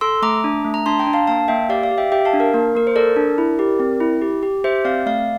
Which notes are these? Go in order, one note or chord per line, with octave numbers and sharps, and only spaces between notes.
A4 C6 E6
A3 A#5 D6
D4
A3
A#5
D4 A5 C6
G5 A#5
D4
F5 A5
A#3 F5 A5
A#3 E5 G5
G4 D5 F5
D5 F5
G4
E5 G5
G4 E5 G5
F5 A5
D4
A#4
A#3 A#4
A#3 A#4
C5
A4 A#4 D5
D4
E4
G4
C4
E4
G4
G4
G4 C5 E5
C4 D5 F5
A3 D5 F5